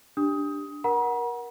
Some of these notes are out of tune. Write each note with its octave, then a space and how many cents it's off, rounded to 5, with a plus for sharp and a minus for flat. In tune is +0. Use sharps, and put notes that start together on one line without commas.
D4 +0 G4 +0 D#6 +15
A#4 +25 F#5 +0 A#5 +45